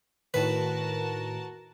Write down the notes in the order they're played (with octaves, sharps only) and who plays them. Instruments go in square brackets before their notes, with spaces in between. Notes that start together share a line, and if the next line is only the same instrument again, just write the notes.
[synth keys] A2 D#3 [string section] F#4 A#4 A5 [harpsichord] B4